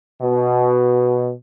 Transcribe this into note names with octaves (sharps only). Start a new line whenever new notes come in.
B2